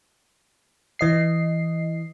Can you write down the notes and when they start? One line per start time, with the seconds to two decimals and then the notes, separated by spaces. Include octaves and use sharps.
0.99 E3 D#5 C7